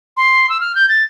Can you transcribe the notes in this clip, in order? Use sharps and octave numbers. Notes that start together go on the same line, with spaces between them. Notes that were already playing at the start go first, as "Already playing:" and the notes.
C6
E6
F6
G6
A6